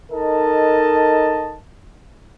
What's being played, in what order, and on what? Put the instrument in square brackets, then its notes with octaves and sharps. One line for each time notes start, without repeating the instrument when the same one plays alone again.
[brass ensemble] D#4 A4 A#4 D#5 A5